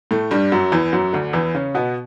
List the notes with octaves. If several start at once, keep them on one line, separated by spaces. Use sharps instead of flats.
A2 A3
G2 G3
F#2 F#3
E2 E3
F#2 F#3
D2 D3
E2 E3
C#3 C#4
B2 B3